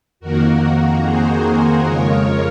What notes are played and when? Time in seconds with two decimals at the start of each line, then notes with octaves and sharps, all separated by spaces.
0.20 F2 D#3 A#3 F#4 A#4
1.02 G#4 C5
1.84 F2 C#3 F3 G#3 A#4 C#5